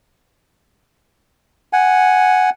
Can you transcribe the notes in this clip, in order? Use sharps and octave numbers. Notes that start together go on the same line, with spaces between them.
F#5 G#5